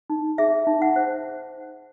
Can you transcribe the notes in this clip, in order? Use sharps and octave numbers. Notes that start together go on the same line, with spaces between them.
D#4
G#4 E5
D#4
F#5
C5